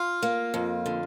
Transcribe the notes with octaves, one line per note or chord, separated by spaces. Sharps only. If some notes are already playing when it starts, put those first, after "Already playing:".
Already playing: F4
A#3
F2
D3